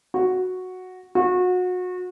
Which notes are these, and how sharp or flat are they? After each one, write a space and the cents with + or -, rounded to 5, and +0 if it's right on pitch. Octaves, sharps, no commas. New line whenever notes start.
F#4 -5
F#4 -30